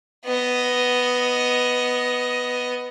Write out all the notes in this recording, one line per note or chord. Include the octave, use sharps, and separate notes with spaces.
B3 D#5